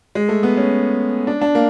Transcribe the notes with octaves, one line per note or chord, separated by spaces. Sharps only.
G#3
A3
B3
C#4
D4
D4
A#3